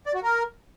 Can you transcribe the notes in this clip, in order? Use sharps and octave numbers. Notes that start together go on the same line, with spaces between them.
D5
F#4
A#4